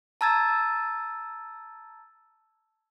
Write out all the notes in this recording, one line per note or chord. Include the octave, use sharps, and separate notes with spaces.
A5 A#5 E6 G#6 A6